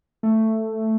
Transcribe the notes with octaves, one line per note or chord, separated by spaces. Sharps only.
A3